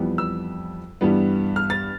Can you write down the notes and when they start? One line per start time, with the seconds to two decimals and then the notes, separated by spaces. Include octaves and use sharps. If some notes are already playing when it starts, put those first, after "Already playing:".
Already playing: F2 E3 G3 B3
0.18 E6
1.01 G2 E3 G3 B3
1.56 F6
1.70 A6